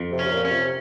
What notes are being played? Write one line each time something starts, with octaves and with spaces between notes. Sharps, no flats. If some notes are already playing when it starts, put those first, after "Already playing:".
Already playing: F2
C3
C#4
C3
A#2
C#4
C3